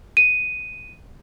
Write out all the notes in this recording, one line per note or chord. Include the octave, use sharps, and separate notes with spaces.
D#7